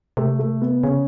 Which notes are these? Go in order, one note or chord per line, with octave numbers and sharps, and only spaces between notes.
C3 A3
A3
B3
C#3 C#4